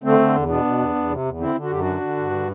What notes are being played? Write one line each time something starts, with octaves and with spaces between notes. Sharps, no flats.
D3 A3 C4
D3
E2
B2 B3 D4
B2
E2
E2
C3
E2
D3 C4 E4
D3
F#4
F#2 G4
D4 F#4
D3
D3
G2
D3